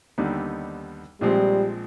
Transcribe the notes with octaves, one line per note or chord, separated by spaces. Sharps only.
D#2 D3 G3 B3 D#4
A#1 A#2 F3 G3 G#3 C4